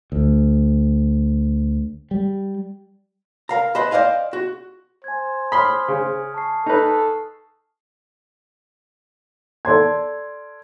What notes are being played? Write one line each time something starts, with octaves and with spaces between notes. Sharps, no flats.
D2
G3
A#4 F5 A#5
B4 C5 D#5 E5 A5 B5
C5 D5 D#5 F5 G#5
F#4
C5 G#5 G#6
B5 C6 D#6 F6
C#3
A5 C#6 C7
D#4 A4 B4
A4 D5 C6 G#6